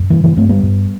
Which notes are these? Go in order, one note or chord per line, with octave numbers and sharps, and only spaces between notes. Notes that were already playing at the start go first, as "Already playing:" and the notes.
Already playing: F#2
G2 E3
E3
G2 A3 C4
G3 B3
G2